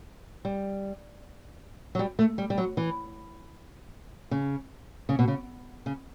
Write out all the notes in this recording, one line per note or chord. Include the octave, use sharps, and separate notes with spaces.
G3
F#3
G3
A3
G3
G3
F#3
E3
C#3
C#3
B2
C#3
C#3